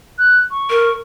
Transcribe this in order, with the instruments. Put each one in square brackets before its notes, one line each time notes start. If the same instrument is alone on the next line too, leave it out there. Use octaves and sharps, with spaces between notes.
[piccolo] F#6
C#6
[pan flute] A#4